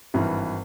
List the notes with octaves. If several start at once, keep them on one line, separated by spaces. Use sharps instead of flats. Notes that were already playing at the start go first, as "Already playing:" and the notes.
G#1 G2 E3